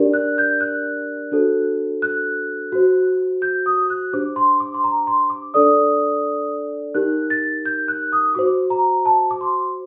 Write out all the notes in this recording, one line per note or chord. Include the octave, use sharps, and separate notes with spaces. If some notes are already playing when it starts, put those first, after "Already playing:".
Already playing: D4 G4 A#4 D5
F#6
G6
F#6
D4 F#4 A4 C5
F#6
F#4 C5
G6
D#6
F#6
D4 G4 C5 D6
C6
D6
C6
A#5
C6
D6
D4 A4 D5 D#6
D#4 G4 A#4 F#6
A6
G6
F#6
D#6
F#4 C5 D6
A#5
A5
D6
C6